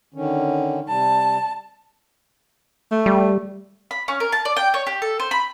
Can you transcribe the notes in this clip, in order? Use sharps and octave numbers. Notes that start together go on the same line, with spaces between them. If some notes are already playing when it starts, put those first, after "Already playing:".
D3 D#3 C#4
C3 G3 A5
A3
G3
B5
C#4
A#4
A5
D5
G5
C#5
G4
A4
C5
B5